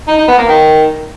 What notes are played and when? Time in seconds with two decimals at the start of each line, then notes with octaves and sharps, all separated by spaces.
0.08 D#4
0.18 D#4
0.28 B3
0.38 A#3
0.48 D#3